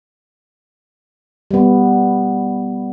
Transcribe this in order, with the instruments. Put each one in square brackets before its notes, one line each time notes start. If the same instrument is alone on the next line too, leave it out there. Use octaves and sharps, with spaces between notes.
[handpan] G3 B3